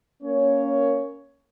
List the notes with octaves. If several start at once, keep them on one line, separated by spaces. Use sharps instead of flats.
A#3 C#4 C#5